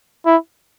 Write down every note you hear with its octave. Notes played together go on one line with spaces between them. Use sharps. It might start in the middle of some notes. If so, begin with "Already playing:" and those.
E4